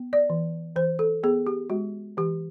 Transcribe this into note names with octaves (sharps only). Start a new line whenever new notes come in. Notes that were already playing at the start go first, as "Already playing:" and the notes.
Already playing: B3
D5
E3
E3 C5
A4
B3 G#4
G4
G#3 F#4
E3 G4